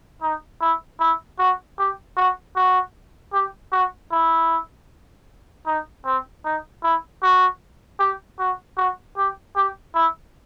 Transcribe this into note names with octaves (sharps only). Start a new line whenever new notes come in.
D#4
E4
E4
F#4
G4
F#4
F#4
G4
F#4
E4
D#4
C4
D#4
E4
F#4
G4
F#4
F#4
G4
G4
E4